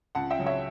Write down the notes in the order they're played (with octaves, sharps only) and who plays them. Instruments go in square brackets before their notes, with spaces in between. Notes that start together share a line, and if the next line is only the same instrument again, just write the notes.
[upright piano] C#2 F#5 A5
E5 G5
C#3 F#3
C#5 E5